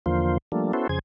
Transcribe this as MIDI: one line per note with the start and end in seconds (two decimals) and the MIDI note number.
0.06 0.38 40
0.06 0.38 50
0.06 0.38 53
0.06 0.38 58
0.06 0.38 65
0.06 0.38 72
0.52 0.72 53
0.52 0.72 55
0.52 0.72 57
0.52 0.72 58
0.52 0.72 62
0.73 0.87 59
0.73 0.87 61
0.73 0.87 64
0.73 0.87 66
0.73 0.87 69
0.73 0.87 72
0.89 0.99 41
0.89 0.99 49
0.89 0.99 68
0.89 0.99 72
0.89 0.99 92